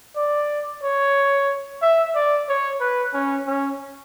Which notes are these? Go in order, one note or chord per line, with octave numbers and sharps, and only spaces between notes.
D5
C#5
E5
D5
C#5
B4
C#4
C#4